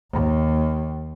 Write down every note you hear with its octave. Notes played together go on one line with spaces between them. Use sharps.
D#2